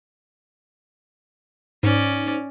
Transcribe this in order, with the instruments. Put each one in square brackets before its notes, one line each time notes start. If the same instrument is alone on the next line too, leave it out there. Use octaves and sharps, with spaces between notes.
[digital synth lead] G#2 [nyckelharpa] C#4 D5